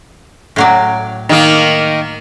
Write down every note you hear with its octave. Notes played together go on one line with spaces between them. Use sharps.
A2 F#3 D5
D#3 A#3